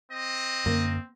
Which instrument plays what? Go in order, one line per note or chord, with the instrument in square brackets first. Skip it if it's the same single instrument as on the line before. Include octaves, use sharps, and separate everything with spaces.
[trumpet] C4 [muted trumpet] D#5
[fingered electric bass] F#2 D3 C#4 [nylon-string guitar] A#3